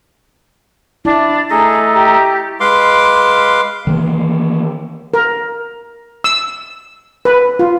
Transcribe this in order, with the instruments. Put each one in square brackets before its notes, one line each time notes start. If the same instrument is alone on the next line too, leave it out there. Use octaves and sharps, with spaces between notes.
[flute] D4 [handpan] E4
[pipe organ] A3 A4 D#5 [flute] G#4 [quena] A#5
[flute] G4
[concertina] G#3 B4 F5 C6 D6
[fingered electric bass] D#3 E3 A#3
[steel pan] A#4
E6
B4
F4